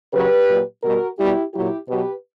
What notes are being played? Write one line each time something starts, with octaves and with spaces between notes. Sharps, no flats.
C#3 F#3 G4 B4
A#2 F#3
B2 G3 F#4 A#4
B2 G3 E4 G4
A#2 F#3 E4 G4
B2 F#3 G4 B4